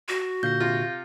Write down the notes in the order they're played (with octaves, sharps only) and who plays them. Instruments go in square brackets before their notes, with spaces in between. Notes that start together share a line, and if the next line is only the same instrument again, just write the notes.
[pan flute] F#4
[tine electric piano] A#2 D3 F5 [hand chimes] G6 A#6
[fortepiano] C3 F4